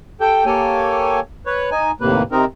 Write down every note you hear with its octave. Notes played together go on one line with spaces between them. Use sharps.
G4 A4 G5
A#3 G4 A4 C#5 G#5
B4 C#5
D#4 G#5
D#2 A2 C3 A#3 B4
C3 C4 D#4 A#4